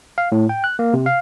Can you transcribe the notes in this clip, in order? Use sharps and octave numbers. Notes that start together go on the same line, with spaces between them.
F5
A2
G5
F#6
A#3
C3
F5